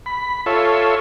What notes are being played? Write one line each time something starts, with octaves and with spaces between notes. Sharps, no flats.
B5
F4 A4 C#5 E5